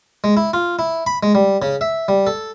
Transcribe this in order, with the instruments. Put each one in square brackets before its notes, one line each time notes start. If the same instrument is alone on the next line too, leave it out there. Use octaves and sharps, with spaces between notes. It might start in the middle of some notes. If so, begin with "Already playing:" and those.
[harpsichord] G#3
E4
F4
E4
B5
G#3
G3
C#3
E5
G3
A4